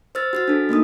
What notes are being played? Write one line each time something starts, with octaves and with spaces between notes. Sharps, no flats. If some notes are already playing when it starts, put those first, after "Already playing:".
C5 E6 F6 A6
F#4 F6 A6
D4 A4
A3 A#3 D#4 D#6